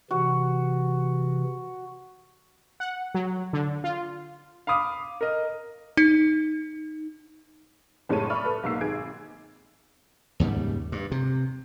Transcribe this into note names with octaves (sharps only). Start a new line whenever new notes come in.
C3 E3 F#4
F#5
F#3
D3
F4
F5 B5 D6 D#6
A#4 D#5
D#4
F#1 A2 G#3 C#5 A5 D#7
D5 E5 B5 C#6 D6 F6
A4 B4
B1 G#2 A#3 E6 C7
G#1 G#4 G#6 D7
D#2 G#2 C#3 G3
G2
C3